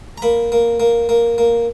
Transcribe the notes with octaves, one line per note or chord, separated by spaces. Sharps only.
A#5
A#3 B5
A#3
A#3
A#3
A#3